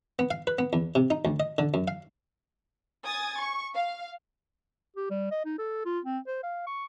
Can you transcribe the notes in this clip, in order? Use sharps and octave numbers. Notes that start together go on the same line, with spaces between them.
B3
F5
B4
B3
E2
C3
D#4
D2
D#5
D3
F#2
F5
G#5 D#6 G#6 A6
C#6
F5
G4
G3
D#5
D#4
A4
F4
C4
C5
F5
C#6